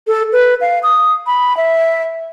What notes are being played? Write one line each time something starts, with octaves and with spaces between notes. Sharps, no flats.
A4
B4
F5
D#6
B5
E5